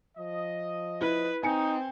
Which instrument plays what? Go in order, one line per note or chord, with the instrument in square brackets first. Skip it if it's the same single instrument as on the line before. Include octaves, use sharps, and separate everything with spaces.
[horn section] F3 D#5
[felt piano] E4 [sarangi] B4
[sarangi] C4 [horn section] D#4 [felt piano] G#5 C#7